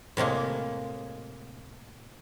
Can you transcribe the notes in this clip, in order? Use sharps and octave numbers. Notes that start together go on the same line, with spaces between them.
A2 C3 G#3 A#3